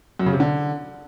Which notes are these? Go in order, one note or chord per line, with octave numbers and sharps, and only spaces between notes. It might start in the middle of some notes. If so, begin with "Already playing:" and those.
F#2
C#3
C3
D3